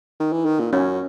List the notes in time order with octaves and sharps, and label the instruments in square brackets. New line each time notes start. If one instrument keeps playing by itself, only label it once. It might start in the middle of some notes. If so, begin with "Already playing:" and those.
[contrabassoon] D#3
E3
D#3
A#2
[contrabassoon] F#2 [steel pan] C#4